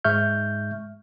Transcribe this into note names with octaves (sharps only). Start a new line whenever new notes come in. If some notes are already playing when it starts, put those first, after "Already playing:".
G#2 G#3 E5 C#6 F6 G6